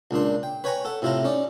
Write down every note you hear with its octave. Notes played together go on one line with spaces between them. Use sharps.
C#2 A#2 D4 C6
G5
B4 C#5 G5 G#5 A#5 C#6
A4 F#5
A2 C3 E4 F4 A4 A#5
C#4 D#4 D5